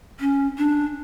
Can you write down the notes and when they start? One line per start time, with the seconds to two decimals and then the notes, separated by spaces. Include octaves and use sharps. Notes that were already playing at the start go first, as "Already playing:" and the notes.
0.20 C#4
0.58 D4